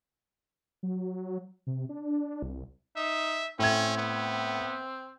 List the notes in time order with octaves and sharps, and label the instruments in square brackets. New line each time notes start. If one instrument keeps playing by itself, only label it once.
[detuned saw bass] F#3
C3
D4
C2
[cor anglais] D#4 [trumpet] E5
[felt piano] A2 G#6 [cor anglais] C4 [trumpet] C#4
[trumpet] B3